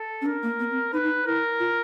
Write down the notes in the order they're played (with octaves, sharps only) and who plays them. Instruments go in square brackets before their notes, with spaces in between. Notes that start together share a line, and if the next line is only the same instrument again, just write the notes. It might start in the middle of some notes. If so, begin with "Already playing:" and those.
Already playing: [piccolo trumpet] A4
[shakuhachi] C#4
[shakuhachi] D4 [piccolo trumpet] A#4
[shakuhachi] A#3
B3
C4
[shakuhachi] D#4 [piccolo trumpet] B4
[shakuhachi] D#4
[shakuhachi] E4 [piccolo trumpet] A#4
[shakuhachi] F4